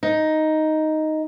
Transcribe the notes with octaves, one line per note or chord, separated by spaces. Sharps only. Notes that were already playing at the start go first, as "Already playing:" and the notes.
D#4